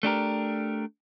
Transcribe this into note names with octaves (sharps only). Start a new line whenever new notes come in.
A3 D4 G4 A#4